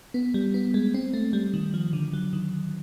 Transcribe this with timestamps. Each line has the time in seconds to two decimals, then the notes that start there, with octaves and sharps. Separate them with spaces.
0.14 B3
0.34 G3
0.54 B3
0.74 G#3
0.94 C4
1.14 A3
1.33 G3
1.54 D#3
1.74 F3
1.93 D3
2.13 F#3
2.33 D#3